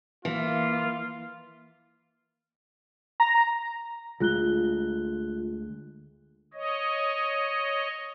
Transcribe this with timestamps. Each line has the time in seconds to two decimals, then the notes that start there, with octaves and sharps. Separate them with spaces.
0.25 E3 A#3 F4
3.20 A#5
4.20 D2 G#3 F4 F#6 G7
6.54 C#5 D#5